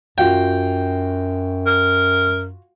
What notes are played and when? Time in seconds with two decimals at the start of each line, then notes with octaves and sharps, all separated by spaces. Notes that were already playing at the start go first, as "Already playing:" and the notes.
0.18 F#2 F4 F#4 F5 G5
1.66 A#4